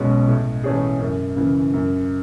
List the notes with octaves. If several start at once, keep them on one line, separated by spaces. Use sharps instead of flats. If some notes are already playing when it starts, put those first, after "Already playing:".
Already playing: B1 B2 G#3 C#4
A2
E3 A3 C#4 G#4
F#2
C#3 E3
F#2